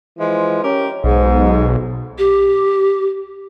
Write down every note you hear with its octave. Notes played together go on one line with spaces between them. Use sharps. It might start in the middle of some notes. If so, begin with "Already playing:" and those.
E3 F3 G#3
C#4 G4 A#4
B1 G#2
G4